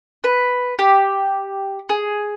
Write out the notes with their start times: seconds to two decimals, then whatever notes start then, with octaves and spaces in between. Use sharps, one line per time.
0.24 B4
0.79 G4
1.89 G#4